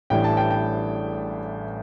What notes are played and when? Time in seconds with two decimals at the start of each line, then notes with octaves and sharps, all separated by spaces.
0.10 A1 A2 E3 G3 D4 G5
0.24 A5
0.37 G5
0.50 G5